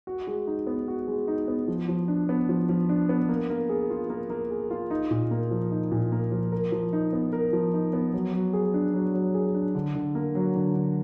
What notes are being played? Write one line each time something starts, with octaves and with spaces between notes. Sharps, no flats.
F#4
G#3
D#4
B3
F#4
G#3
D#4
B3
F3
F3
D4
B3
F3
F3
D4
B3
A#3
A#3
G#4
F4
A#3
A#3
G#4
F4
D#4
A#2
A#3
F3
D#4
A#2
A#3
F3
A#4
F3
D#4
B3
A#4
F3
D#4
B3
F#3
F#3
G#4
D4
F#3
F#3
G#4
D4
D3
D3
A#3
F#3
D3
D3